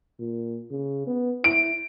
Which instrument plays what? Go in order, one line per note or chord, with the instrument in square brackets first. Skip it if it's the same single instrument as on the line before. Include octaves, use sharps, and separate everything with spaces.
[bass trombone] A#2
C#3
B3
[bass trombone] E4 [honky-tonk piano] D7